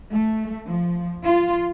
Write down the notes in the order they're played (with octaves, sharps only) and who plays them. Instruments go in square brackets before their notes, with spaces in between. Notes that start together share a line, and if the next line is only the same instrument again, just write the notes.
[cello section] A3
F3
F4